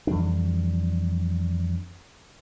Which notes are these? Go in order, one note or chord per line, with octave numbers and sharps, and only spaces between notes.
F2 E3 G3 D4